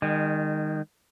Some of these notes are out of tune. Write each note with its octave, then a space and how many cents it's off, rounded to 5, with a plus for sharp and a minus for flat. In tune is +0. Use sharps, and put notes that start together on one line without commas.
D#3 -10 G#3 -40